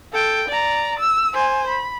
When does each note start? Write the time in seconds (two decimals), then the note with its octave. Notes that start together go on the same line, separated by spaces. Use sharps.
0.13 A4 G5
0.48 D5 A#5
0.99 E6
1.34 C5 G#5
1.68 B5